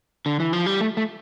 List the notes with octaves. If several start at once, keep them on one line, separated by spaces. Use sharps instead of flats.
D3
E3
F3
G3
A3
A3